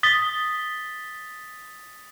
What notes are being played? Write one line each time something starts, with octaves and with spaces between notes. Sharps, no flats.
D#6 A6 B6 G7